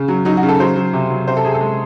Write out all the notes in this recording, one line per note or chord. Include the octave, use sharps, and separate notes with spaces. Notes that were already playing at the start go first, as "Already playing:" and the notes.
Already playing: C#3
F#3
F#3 D#4
F#4
C#3
A4
F#3 C5
F#3
C3
F#3
C3 C5
A4
C3 G#4
A4
G#3